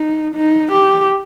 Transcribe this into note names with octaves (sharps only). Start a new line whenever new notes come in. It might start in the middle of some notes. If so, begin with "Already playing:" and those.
Already playing: D#4
D#4
G4